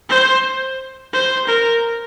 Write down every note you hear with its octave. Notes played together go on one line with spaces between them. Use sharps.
C5
C5
A#4